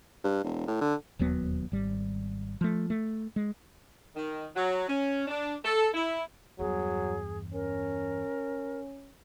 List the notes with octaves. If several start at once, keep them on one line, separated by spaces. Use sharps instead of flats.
G2
E1
A2
D3
E1 D#2 F#3 B3
G#1 G3
F3 A3
A3
G#3
D#3
F#3
C#4
D4
A4
E4
E2 G2 F#3 G#4
C#4 A#4